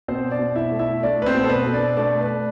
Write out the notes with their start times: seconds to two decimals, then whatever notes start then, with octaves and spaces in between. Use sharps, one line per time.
0.08 B2 C4 C5
0.31 D4 D5
0.39 B2
0.56 E4 E5
0.72 A3
0.79 E4 E5
1.03 A3 D4 D5
1.22 B4
1.26 C4 C5
1.34 B2
1.44 A4
1.50 B4
1.66 B2
1.73 D4 D5
1.97 A3 D4 D5
2.21 B4
2.28 A3